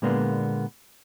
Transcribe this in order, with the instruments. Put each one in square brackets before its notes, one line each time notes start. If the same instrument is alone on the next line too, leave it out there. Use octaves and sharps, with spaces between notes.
[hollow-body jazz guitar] A#2 D3 G#3 A#3 B3